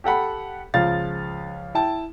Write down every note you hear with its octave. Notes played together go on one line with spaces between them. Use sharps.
G4 A4 F#5 B5
C#2 F3 F5 A6
E4 G5 A5